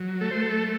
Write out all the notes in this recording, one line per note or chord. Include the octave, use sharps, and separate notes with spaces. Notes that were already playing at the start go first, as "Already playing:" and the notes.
Already playing: F#3
A3 A4
C5
A4